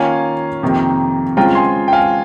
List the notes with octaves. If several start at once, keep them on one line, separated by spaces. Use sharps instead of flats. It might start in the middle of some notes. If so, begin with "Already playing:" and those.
Already playing: D#3 A#3 C#4 F4 F5 G#5
F2 C3 D#3 A#3
C#3 G#3 C4 F4 G5 A#5
G#5 C6
G5
F5 G#5